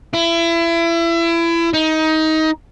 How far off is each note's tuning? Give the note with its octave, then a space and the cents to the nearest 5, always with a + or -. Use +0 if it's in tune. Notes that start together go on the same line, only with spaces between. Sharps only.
E4 +30
D#4 +20